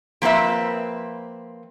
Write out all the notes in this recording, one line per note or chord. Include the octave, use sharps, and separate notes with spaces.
F3 A#3 C4 B4 E5